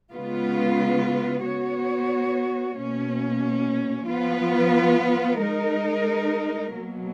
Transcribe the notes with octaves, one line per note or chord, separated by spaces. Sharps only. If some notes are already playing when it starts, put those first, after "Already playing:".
C#3 G#3 B3 F4 B4
B3 F#4 C#5
B2 A#3 C#4
F3 B3 F4 B4
G#3 D#4 A#4
B2 F#3 A#3